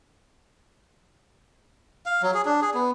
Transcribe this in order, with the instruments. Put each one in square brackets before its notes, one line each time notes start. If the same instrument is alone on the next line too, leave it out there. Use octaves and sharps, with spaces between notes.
[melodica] F5
F#3
G#4
D4
G#4
B3